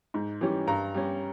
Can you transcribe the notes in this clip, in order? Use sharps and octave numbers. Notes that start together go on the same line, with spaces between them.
G#2
E3 G3 C#4
G2 A#5
G3 C#4